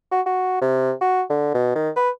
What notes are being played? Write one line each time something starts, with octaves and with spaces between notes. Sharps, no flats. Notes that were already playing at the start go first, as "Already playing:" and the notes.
F#4
F#4
C3
F#4
D3
B2
D#3
B4